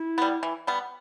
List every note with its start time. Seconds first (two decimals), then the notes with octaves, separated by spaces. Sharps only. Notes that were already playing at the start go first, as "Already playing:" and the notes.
Already playing: E4
0.18 G3 B3
0.43 E3
0.67 G3 B3